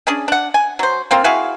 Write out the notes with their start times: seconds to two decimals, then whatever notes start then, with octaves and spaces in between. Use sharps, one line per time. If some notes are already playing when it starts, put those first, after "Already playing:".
0.07 C#4 D4 G#4
0.28 D4 F#5
0.54 G#5
0.79 F#3 C5
1.11 A#3 C4 F4
1.24 E4 F#4 G#4 F5